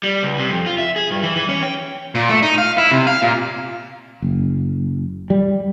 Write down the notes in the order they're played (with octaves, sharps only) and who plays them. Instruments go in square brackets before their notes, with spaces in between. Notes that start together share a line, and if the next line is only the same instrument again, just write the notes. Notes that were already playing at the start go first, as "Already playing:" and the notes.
[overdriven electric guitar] G3
C#2
C3
F2
F4
E5
G#4
G2
E3
E3
C#4
G5
[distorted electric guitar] A#2
A3
D#4
F5
E4
C3
F5
A#2
[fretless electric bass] F#1
G3